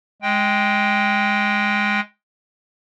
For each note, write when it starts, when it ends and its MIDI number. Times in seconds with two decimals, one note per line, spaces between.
0.22 2.00 56
0.22 2.00 79